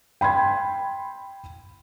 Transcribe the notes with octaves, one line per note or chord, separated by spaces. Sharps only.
G5 B5 C6 G#6